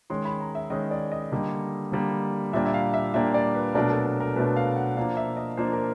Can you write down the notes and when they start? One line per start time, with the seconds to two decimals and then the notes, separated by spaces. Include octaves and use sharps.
0.10 D#3 G#3 C#4 C6
0.25 B5
0.41 A#5
0.55 E5
0.70 D#3 G#3 C#4 D#5
0.91 D5
1.12 D#5
1.32 D3 G3 A#3
1.92 D3 G3 A#3
2.53 A#2 G3 A#3 D4 E5
2.65 E5
2.74 F5
2.94 E5
3.14 A#2 G3 A#3 D4 E5
3.34 D5
3.55 B4
3.75 B2 F#3 A3 D4 A#4
3.90 A4
4.06 A#4
4.20 A#4
4.36 B2 F#3 A3 D4 B4
4.56 F5
4.76 F#5
4.97 F3 A#3 D4 F5
5.17 E5
5.37 D#5
5.57 F3 A#3 D4 C5
5.73 A#4